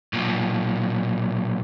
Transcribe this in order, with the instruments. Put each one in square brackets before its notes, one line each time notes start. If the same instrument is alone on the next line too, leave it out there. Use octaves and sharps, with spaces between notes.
[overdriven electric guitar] B1 A#2